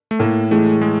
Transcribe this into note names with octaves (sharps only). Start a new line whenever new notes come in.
A3
A2 A#3
E3 G#3 A3
G#3